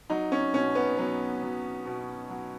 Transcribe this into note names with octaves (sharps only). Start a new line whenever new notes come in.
F#3 D#4
C#4
B2 C#4
B3
F#3 B3
F#3
B2
F#3